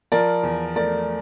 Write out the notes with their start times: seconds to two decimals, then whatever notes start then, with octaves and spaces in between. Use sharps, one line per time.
0.12 F3 A#4 D5
0.43 E2
0.76 A3 A#4 D5